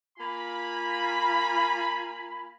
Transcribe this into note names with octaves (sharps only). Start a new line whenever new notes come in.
A#3 F4 G#5 B5